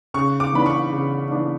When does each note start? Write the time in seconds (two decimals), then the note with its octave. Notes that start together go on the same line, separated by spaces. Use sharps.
0.14 C#3 C#6
0.40 D6
0.53 E3 B3 D4 B5
0.66 C#6
0.92 C#3
1.31 E3 B3 D4